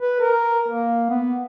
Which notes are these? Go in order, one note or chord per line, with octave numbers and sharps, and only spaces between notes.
B4
A#4
A#3
B3